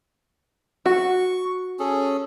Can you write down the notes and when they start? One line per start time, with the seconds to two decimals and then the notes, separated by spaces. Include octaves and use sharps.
0.86 F#4 C#6
1.79 C#4 G#4 A4